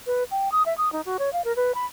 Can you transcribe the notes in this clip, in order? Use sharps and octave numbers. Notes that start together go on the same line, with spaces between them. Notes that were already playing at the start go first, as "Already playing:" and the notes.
B4
G5
D#6
E5
D#6
D#4
F#4
C#5
F5
A#4
B4
B5